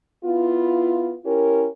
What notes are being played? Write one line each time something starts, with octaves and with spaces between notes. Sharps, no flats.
B3 E4 F4
C#4 E4 G4 A#4